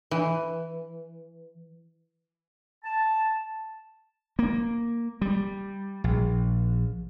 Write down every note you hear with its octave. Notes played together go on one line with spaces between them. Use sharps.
E3
A5
A#3
G3
A#1